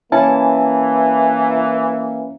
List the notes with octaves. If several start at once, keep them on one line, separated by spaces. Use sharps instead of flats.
E3 A#3 C#4 E4 A5